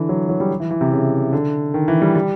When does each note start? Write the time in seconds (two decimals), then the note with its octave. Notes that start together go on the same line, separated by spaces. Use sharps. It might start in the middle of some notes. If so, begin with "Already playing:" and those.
Already playing: D3 E3
0.09 F#3
0.29 F#3
0.40 G3
0.60 E3
0.70 E3
0.81 C3
0.91 C#3
1.33 D3
1.74 D#3
1.88 E3
2.02 G3
2.15 G3